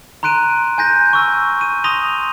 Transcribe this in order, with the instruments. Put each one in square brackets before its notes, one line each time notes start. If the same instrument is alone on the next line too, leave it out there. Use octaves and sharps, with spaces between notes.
[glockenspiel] A#5 C6 F#6 D7 D#7
G#5 G6 A#6
C#6 E6
D#7
C6 D#6 A#6 D#7 F7 G7